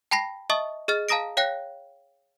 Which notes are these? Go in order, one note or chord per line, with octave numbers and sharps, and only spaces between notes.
G5 A5 B5 A#6 C7
D#5 E5 A5 C#6 D#6
G#4 D#5 F6 A6
F5 A5 A#5 D#6 A#6 D7
C#5 F5 G5 F#6 A#6